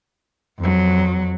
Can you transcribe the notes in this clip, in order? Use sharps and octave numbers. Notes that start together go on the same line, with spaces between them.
F2 F#3